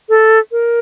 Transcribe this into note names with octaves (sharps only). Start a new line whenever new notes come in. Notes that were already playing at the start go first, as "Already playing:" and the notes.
A4
A#4